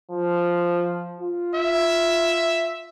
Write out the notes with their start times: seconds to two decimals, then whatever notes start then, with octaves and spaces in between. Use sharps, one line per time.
0.11 F3
1.20 F4
1.54 E5